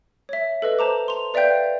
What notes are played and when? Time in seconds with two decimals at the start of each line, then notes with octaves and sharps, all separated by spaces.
0.29 C#5 E5
0.62 A4 B4 D#5
0.79 C5 A5 A#5 D6
1.08 C6 F7
1.34 B4 D5 E5 F5 G5 G6